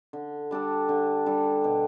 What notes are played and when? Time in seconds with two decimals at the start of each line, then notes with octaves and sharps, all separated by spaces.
0.13 D3
0.51 G3 D4 A4
0.89 D3
1.26 G3 D4 A4
1.64 B2